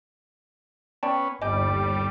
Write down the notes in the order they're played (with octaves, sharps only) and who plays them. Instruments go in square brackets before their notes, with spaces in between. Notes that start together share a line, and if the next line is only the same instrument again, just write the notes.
[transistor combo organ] B3 C#4 [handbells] D5 G5 A5
[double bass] G1 D#2 [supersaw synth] G3 [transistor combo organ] D5 [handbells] D#5 G#5 G6